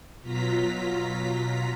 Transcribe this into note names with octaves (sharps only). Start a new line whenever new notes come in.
B2 F#3 F4 A#5 B6